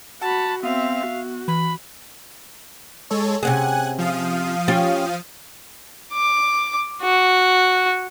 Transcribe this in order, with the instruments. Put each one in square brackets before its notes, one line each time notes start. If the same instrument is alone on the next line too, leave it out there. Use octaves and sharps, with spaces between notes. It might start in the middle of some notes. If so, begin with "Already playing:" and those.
[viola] F#4 B5 [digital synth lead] F#5 [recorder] A5
[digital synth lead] B3 [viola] C4 E5 [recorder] F5
[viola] F#4
[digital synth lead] E3 [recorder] B5
[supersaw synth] G#3 A4 C#5
[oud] C3 C#4 G#4 [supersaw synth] F#5 G#5 F#6
[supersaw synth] F3 F5 D#6
[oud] C#4 F4 G4
[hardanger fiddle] D6
F#4